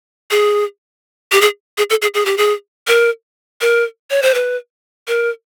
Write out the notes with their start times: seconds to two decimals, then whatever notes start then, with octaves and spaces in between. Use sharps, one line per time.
0.31 G#4
1.32 G4
1.41 G#4
1.78 G#4
1.90 A4
2.02 G#4
2.14 G#4
2.26 G4
2.38 G#4
2.88 A#4
3.61 A#4
4.10 C#5
4.22 C5
4.34 B4
5.08 A#4